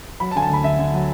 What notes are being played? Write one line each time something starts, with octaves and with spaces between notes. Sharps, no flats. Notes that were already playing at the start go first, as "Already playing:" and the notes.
F#3 B5
A5
D3 G#5
A5
D2 B5
D3 E5
D3
F#3